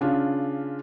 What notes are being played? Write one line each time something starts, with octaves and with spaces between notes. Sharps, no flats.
C#3 C#4 D4 F4